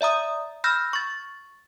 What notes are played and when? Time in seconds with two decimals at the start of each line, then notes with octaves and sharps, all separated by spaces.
0.01 D5 E5 A#5 D#6
0.64 B5 E6 F6 G6 A#6
0.93 C#6 A6